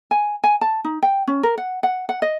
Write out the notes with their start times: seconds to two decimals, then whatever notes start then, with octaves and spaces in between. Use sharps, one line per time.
0.11 G#5
0.44 G#5
0.61 A5
0.84 D#4
1.03 G5
1.27 C#4
1.43 A#4
1.58 F#5
1.83 F#5
2.09 F#5
2.22 D#5